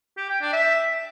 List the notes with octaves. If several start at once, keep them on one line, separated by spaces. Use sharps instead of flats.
G4
G5
D4
E5